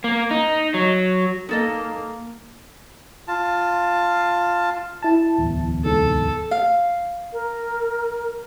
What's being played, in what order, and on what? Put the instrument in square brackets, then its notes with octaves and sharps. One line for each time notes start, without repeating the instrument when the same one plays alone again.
[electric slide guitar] A#3
D#4
F#3
[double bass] A#3 [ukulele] D#4 A4 D#5
[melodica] F4 A5
[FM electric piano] E4 A5
[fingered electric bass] D1 E2
[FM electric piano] C2 G#2 [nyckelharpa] A4
[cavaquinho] F5
[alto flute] A#4